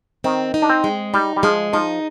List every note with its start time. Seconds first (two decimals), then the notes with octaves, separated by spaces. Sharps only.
0.24 D#3 C4
0.54 D#4
0.62 D4
0.70 C4
0.84 G#3
1.14 G3 D#4
1.36 G3
1.43 F3 G#3
1.73 F3 D#4